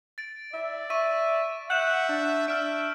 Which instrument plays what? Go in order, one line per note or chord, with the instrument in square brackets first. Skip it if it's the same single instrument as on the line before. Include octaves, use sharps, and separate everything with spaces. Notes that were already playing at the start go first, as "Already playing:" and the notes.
[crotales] A6 D7
[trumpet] D5 [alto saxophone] E5
[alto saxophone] E5 [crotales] C#6 D#7
[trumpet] E5 [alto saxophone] F#5 [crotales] G6 E7
[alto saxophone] D4
[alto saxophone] D4 [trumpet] E5 [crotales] E6 F6 D7